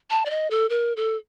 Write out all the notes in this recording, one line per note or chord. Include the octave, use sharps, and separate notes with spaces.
A5
D5
D#5
A4
A#4
A4